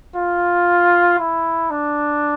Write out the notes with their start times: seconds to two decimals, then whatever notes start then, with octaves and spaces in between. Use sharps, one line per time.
0.16 F4
1.20 E4
1.71 D4